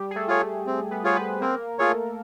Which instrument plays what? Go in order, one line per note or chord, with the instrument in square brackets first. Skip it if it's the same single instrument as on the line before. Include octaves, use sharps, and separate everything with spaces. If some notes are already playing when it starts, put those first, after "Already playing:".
Already playing: [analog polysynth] G3 G4
G#4
A3 A4
[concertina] F4 G#4 C#5
[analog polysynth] A3 A4
[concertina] C4
[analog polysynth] B3 B4
[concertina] F4 G#4 C#5 [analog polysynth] C5
[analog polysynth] B3 B4
[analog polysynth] A#3 A#4 [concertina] C4
[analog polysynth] A3 A4 [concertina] F4 G#4 C#5